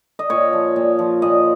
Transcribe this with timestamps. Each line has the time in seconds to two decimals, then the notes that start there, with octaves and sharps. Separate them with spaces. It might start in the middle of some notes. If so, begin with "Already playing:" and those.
0.19 D#5
0.30 A#2 C#5
0.53 F3
0.76 A#2
0.99 F3
1.22 A#2 D#5